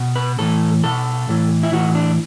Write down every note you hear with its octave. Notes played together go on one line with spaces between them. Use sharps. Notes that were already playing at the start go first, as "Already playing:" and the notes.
Already playing: B2
B4
A2 E3 A4
B2 A4
A2 E3
E4
A2 E3 F#4
D4